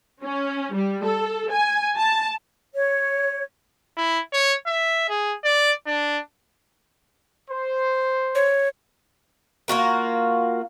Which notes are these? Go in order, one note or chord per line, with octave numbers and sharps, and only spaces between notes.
C#4
G3
A4
G#5
A5
C#5
E4
C#5
E5
G#4
D5
D4
C5
C#5
A#3 F4 F#4 A#4